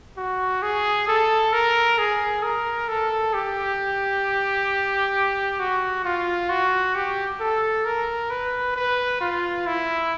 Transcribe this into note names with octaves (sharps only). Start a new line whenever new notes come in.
F#4
G#4
A4
A#4
G#4
A#4
A4
G4
F#4
F4
F#4
G4
A4
A#4
B4
B4
F4
E4